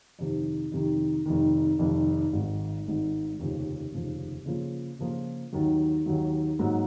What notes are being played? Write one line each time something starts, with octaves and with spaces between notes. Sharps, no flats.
F2 C3 D#3
F2 C3 D#3
F1 F2 D#3
F1 F2 D#3
G#1 G#2 D#3
G#1 G#2 D#3
F1 D#2 C#3 F3
F1 D#2 C#3 F3
C#3 F3 A#3 F4
C#3 F3 A#3 F4
D#2 D#3 F#3
D#2 D#3 F#3
G#2 F#3 A#3